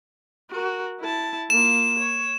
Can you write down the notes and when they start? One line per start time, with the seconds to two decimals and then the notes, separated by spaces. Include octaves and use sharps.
0.50 F#4 A#4
1.00 E4 A5
1.50 A#3 F4 E7
1.98 C#5